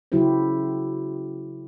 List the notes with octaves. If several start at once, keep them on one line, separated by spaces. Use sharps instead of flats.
C#3 F#3 E4 F#4 G4 C5